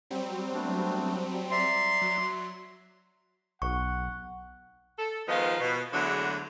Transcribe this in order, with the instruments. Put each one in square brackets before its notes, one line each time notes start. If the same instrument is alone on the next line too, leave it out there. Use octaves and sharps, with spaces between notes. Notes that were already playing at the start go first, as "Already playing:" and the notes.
[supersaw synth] F#3 G3 C4
[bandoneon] A3 B3 D4
[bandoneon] D5 E5 A#5 [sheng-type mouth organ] C6
[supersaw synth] F#3
[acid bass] B1 [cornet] F#5 [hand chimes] C#6
[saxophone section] A4
D#3 F3 G#3 B3 D#4 F4
B2
E2 D3 E3 F#3 G#3 A3